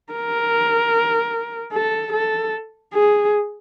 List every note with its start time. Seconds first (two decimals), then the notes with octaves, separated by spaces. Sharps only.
0.13 A#4
1.73 A4
2.13 A4
2.93 G#4